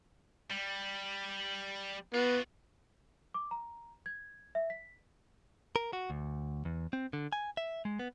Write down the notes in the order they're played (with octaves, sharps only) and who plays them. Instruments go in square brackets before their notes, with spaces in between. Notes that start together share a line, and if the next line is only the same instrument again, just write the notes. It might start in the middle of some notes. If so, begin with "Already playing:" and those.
[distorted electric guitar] G3
[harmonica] B3 [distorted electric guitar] F4 F#4
[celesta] D6
A#5
G#6
E5
B6
[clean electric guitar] A#4
F#4
D2
E2
C4
D3
G#5
E5
G#3
B3